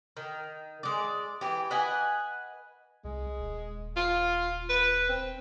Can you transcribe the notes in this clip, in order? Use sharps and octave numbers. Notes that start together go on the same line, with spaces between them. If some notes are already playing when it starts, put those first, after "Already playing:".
D#3
G#3 D5
E3 G4
B4 D#5 F#5 G#5
C2 G#3
D#1
F4
B4
C4